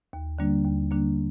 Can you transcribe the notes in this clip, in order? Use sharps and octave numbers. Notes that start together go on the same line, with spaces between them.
D#2
D3 G3 A#3 D4
D#2
D3 G3 A#3 D4